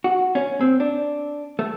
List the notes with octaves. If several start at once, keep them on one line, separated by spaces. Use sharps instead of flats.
F#4
C#4
C4
D4
A3